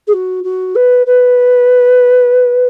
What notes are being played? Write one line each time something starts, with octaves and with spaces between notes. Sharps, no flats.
G#4
F#4
F#4
B4
B4